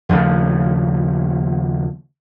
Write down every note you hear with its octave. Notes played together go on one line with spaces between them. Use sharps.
D#2 C#3 F3 A3